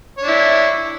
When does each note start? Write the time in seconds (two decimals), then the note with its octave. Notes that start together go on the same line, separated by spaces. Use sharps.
0.18 C#5
0.23 D4
0.28 E4